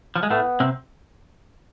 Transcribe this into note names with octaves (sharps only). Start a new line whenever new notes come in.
F3
G#3
A2 A3 B3
C3 C4